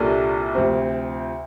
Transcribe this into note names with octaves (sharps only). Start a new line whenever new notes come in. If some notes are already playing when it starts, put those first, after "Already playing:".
Already playing: C2 A#2 G3 D4 A4
D2 C3 F3 C4